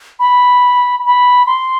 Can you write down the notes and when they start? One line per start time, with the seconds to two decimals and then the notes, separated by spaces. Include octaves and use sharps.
0.19 B5
1.05 B5
1.46 C6